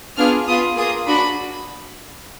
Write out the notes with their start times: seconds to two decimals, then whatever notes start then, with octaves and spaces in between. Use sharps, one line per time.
0.17 B3 D4 F4 G#4 F6
0.47 B3 F4 G#4 D#6
0.76 A#3 F4 G#4 D#6
1.07 D4 F#4 B5